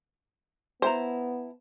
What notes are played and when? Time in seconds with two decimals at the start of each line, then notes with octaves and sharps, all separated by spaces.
0.82 B3 E4 C5 A5 A#5